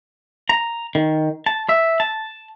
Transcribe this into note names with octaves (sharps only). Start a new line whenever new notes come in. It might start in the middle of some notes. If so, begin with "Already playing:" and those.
A#5
D#3
A5
E5
A5